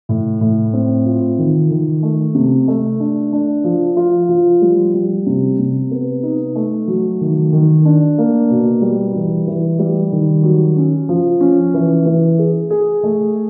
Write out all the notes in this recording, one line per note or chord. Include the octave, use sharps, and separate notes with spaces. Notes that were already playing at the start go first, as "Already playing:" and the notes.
A2
A2
C4
F4
D#3
D#3
A3
C3
A3
D4
D4
F3
F4
F3
G3
G3
C3
C3
B3
D#4
A3
F#3
D#3
D#3
D4
A#3
B2
G3
E3
E3
G3
D#3
F#3
C#4
F3
C#4
E3
E3
G#4
G#4
A3